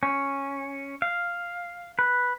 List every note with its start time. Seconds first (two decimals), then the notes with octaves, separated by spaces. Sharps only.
0.03 C#4
1.02 F5
1.99 B4